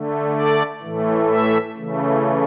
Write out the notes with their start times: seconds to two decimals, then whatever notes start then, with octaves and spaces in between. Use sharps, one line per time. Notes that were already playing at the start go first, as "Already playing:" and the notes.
Already playing: D3 A3
0.34 D5
0.81 A2 E3 A3
1.29 E5
1.76 C#3 E3 A3